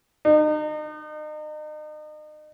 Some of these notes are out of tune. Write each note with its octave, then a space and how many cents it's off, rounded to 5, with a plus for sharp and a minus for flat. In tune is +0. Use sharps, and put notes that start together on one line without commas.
D#4 -35